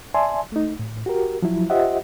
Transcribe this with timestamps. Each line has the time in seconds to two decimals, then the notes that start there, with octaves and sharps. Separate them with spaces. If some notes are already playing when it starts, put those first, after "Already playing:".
0.14 D5 E5 G#5 A5 C6
0.52 A3 D#4
0.79 A2
1.06 F#4 G4 A#4
1.42 F3 F#3 E4
1.70 F4 G4 C5 D#5 E5 F#5